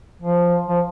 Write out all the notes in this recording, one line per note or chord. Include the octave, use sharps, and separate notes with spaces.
F3
F3